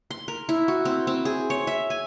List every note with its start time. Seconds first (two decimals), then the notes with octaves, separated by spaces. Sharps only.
0.11 C6
0.28 A#4
0.49 E4
0.68 F#4
0.85 C4
1.07 C4
1.25 G#4
1.50 C#5
1.67 E5
1.90 G#5